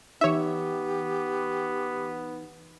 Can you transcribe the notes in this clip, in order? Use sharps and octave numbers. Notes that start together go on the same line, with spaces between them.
E3 B3 D#4 G4 C#5 E5